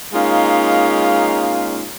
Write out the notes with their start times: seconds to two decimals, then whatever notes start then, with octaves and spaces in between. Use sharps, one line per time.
0.13 G#3 A#3 C#4 D#4 F4 F5